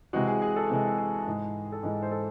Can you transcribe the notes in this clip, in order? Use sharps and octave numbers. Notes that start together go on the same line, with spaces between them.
C3 E3 G#3 F#4
G#4
G#4
A4
C3 E3 G#3
G#4
G#2 E3 G#3
A4
G#2 E3 G#3 G#4
C5
A4